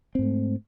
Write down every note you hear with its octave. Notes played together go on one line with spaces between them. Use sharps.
G#2 A3 C4